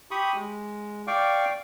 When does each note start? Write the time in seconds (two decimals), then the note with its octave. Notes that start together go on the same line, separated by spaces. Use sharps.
0.11 G4 B5 C#6 D#6
0.35 G#3
1.07 D5 F5 G5 C#6 D6